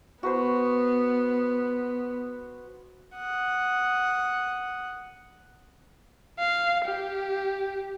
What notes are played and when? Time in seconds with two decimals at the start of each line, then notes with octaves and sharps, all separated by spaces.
0.23 B3 F#4 B4 C5
3.15 F#5 D#6
6.39 F5
6.85 G4